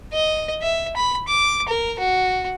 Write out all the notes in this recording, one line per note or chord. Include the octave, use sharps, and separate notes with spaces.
D#5
E5
B5
D6
A#4
F#4